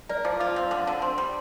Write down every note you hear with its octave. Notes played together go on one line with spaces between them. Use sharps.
A#4 D5
F3 D6
F4 D6
C4
D3 D6
D3
C4 C6
G3